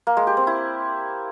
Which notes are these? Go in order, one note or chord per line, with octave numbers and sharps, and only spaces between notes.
A#3
G#3
G4
C4
E4